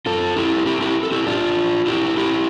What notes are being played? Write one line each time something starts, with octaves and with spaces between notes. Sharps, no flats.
F4 A4
E4 G4
E4 G4
E4 G4
A4
E4 G4
D4 F4
E4 G4
E4 G4